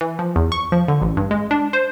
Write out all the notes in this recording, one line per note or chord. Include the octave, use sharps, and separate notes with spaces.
E3
F3
E2
C#6
F3
D3
A1
G2
G#3
D4
C5